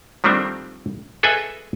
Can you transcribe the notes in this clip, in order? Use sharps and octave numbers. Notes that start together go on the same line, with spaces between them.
D#3 F3 G3 A3 C4 D4
G#4 A4 B4 D#5 E5 G#5